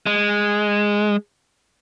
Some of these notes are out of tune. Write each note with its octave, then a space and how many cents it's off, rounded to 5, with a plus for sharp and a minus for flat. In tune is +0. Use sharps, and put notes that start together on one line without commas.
G#3 -10